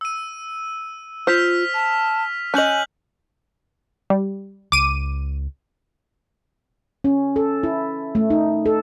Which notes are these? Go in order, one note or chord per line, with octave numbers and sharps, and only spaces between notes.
E6 D#7
F4 C5 F6 B6 F7
A5
C#4 D#5 G#5 F#6 G6 F#7
G3
C#2 D6 D#7
C#4
A4
E4
A3
D#4
A4